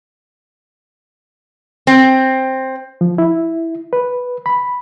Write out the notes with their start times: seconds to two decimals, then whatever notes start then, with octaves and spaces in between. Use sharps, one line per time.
1.87 C4
3.01 F3
3.18 E4
3.93 B4
4.46 B5